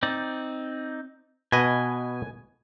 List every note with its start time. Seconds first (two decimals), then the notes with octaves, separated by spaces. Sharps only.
0.03 C4 D#4 D5
1.52 B2 B4 D#5 G#5